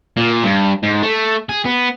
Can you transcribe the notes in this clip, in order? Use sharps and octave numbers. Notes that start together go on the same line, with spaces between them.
A#2
G2
G#2
A3
G#4
B3